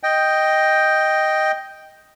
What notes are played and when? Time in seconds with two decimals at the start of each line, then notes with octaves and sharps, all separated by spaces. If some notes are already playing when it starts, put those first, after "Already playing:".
0.03 D#5 G5